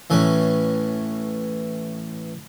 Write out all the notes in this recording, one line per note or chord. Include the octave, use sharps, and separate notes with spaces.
A2 E3 C#4